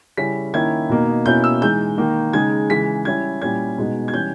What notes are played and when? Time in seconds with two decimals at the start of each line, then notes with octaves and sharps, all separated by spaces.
0.17 C#3 G3 C#4 E4 B6
0.54 D#3 A#3 C#4 E4 G#6
0.89 B2 A#3 D#4
1.26 B2 A#3 C#4 E4 G6
1.44 E6
1.61 E3 G#3 D#4 G6
1.97 D#3 A#3 D#4
2.33 C#3 G#3 D#4 G#6
2.70 C#3 E3 G#3 B6
3.05 G3 C#4 E4 G#6
3.42 A#2 G3 C#4 E4 G#6
3.78 B2 G#3 B3 D#4
4.08 G#6
4.13 E3 G3 C#4 G6